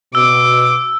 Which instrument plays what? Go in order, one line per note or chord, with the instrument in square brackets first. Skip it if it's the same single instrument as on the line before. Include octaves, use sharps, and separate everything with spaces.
[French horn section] B2 [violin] D6 [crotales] E6